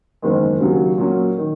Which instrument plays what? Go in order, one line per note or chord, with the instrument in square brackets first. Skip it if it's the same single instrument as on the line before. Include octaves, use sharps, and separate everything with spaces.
[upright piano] F#1 E2 D#3 G#3
D#2 C#3 F#3
A#2 F#3 C#4
D#3